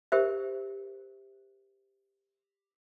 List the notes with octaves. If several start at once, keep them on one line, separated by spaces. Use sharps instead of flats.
G4 A#4 C5 E5